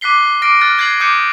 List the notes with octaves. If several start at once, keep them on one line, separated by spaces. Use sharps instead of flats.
D6 F#6 B6 C7 G7
D6 F6 A#6 C7 D7
F6 F#6 A6 A#6
F#6 G#6 A6 C7 F#7
D6 D#6 G6 C#7